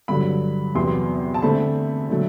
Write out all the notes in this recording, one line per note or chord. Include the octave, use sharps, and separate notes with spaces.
G2 D3 F#3 B5
E2 C3 F#3 B3 C6
A5
D3 A3 C4 B5
D3 F#3 A3